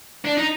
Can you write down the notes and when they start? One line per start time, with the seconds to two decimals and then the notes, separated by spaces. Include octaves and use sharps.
0.24 D4
0.37 D#4